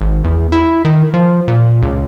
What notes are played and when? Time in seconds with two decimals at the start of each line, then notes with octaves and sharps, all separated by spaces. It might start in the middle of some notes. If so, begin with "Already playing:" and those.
0.01 G#1
0.24 E2
0.52 E4
0.85 D#3
1.14 F3
1.48 A#2
1.82 C#2